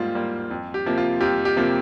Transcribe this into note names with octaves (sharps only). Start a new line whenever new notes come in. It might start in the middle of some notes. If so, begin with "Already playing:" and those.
Already playing: G#2 G3 A#3 F4
G3 A#3
F2
G4
C3 F3 A#3
F4
F2 G4
G4
C3 F3 A#3